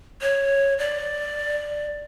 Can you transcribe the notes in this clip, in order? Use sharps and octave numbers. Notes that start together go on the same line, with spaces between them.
C#5
D5